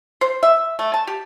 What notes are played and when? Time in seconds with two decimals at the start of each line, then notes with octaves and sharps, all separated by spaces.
0.21 C5
0.43 E5
0.79 A3
0.94 A5
1.07 G4